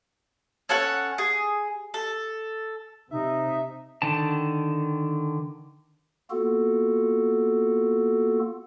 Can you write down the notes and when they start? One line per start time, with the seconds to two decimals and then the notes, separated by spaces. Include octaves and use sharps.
0.69 C#4 A4 C#5 F#5
1.18 G#4
1.94 A4
3.11 C3 D#4 E5
4.02 D3 D#3 A5
6.30 A#3 B3 F4 F#4 A4